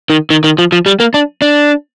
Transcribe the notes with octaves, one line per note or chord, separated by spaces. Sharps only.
D#3
D#3
D#3
F3
F3
G3
A#3
D4
D4